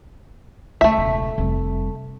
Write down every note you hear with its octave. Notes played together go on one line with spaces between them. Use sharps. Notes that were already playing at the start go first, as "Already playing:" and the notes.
C#2 C#3 A3 E5
E1 C#2
F1 G3